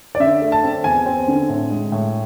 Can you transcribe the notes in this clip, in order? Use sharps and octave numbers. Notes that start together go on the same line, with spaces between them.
D5
D3 E5
A3
A5
C4
E2 G#5
C4
D3
A2
G#3
A2